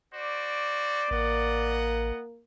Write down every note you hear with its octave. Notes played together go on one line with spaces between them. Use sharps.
F#4 C5 D5 D6
A1 A#3 B3 D#5 F#5